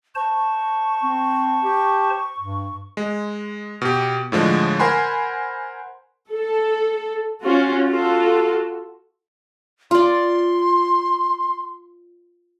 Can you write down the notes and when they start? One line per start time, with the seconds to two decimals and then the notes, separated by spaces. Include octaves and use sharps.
0.15 C5 A5 C#6
1.03 C4
1.64 G4
2.39 G2
2.97 G#3
3.81 B2 G4
4.32 A2 D3 F3 G#3
4.80 A#4 C5 F#5 G#5 B5 C6
6.32 A4
7.41 C#4 F4 F#4
7.87 F4 F#4 A4
9.91 F4 D5 C6